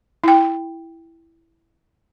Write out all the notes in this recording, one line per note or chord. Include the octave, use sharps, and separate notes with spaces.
E4 G5